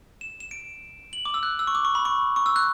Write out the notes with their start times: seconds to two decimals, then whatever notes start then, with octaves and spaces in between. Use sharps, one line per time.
0.21 E7
0.40 E7
0.51 D7
1.13 F#7
1.25 D6
1.34 E6
1.43 F#6
1.59 E6
1.67 C#6
1.75 D6
1.85 C#6
1.95 B5
2.05 C#6
2.36 C#6
2.46 E6
2.56 F#6